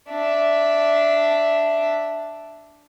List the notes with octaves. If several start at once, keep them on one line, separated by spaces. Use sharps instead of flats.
D4 E5